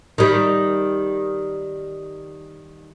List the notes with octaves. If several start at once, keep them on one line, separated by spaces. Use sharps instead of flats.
D#3 G3